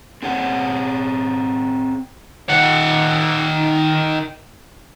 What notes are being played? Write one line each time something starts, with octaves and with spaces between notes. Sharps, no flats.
C4 G#4 C#5 F#5
D#3 F#5